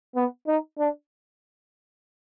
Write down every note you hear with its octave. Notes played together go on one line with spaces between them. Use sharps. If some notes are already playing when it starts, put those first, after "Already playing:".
B3
D#4
D4